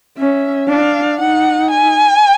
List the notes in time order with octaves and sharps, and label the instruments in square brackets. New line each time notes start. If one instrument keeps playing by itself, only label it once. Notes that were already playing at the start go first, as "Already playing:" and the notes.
[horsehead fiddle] C#4 [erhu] E5
[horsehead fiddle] D4 [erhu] F5
[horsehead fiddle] D#4 [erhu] F#5
[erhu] G#5